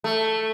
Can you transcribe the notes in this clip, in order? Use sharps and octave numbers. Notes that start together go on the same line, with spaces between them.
A3